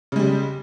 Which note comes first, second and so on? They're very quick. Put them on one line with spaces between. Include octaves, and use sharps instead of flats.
C#3 G#3 G3